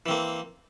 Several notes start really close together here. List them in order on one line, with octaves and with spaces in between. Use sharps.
E3 C4 A#3